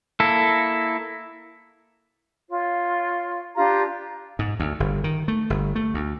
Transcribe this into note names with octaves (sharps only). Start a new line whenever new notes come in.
A#3 E4 A4
F4 C#5
D4 F4 G4 A#5
G#2
D2
G1
D#3
A3
G1
A3
D2